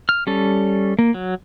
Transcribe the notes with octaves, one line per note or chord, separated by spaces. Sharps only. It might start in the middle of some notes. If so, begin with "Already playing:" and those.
F6
G3 C#4 A4
A#3
F#3